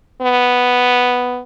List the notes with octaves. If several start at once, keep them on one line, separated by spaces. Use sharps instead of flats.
B3